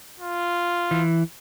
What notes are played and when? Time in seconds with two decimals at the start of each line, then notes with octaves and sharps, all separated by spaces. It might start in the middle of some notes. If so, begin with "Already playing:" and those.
0.20 F4
0.91 E3